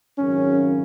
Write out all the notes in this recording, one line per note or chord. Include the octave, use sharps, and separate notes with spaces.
G#1 F#2 C#3 C#4